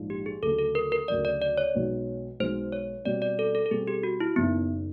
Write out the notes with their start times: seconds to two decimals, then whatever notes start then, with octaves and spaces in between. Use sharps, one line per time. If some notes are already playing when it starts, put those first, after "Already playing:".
Already playing: A#1 G#2 F3
0.10 G4
0.26 G#4
0.43 D2 C#3 F#3 A3 A4
0.59 A4
0.75 A#4
0.92 A#4
1.08 D2 C#3 F#3 A3 D5
1.25 D5
1.42 D5
1.58 C#5
1.74 B1 B2 G#3 B3
2.40 B1 B2 G#3 B3 C5
2.72 C#5
3.05 B2 G3 C4 D5
3.22 D5
3.39 A4
3.55 A4
3.66 A4
3.71 B2 G3 C4 G#4
3.87 G4
4.03 F#4
4.20 E4
4.36 F#1 F#2 D#3 B3